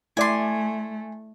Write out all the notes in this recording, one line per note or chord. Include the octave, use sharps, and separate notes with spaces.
A3 E4 D5 G#5 C6